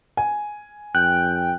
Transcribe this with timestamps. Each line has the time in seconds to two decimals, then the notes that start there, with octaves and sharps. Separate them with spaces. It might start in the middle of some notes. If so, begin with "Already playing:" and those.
0.17 G#5
0.95 F2 G5 F#6